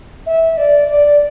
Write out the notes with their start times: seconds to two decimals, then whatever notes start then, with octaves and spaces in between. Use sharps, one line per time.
0.26 E5
0.57 D5
0.88 D5